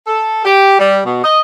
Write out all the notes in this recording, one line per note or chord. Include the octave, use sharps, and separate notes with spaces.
A4
G4
G3
B2
D#5